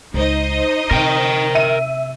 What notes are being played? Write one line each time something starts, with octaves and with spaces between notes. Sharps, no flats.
C#2 D#4 C5 D#5
C3 A#4 G5
E5 D#7